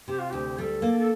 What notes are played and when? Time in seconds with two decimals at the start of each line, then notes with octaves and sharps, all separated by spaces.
0.08 C3 G4
0.19 F4
0.30 D2 G4
0.58 G3 A4
0.82 A#3
0.98 A4